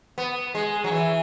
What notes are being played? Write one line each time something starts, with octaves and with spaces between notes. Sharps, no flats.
B3
G#3
F#3
E3